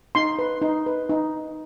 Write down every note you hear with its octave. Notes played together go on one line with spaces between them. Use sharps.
D#4 C6
B4
D#4
B4
D#4